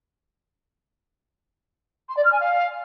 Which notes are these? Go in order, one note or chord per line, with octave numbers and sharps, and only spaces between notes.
C6
D5
F6
G#5
F5